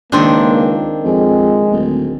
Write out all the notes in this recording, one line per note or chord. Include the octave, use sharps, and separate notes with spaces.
C#2 D#3 A#3 C4 D4
F2 G#3
D1